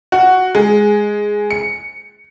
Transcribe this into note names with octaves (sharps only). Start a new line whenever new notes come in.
F#4
G#3
C#7